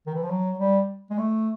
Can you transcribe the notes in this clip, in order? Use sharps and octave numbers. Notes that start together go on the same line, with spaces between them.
D#3
E3
F3
F#3
G3
G#3
A3